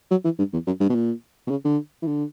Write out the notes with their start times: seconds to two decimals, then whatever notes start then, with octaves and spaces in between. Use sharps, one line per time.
0.11 F#3
0.24 E3
0.38 G2
0.53 E2
0.67 F#2
0.80 G2
0.90 B2
0.95 A#2
1.47 B2
1.51 C#3
1.65 D3
2.03 E3
2.07 D3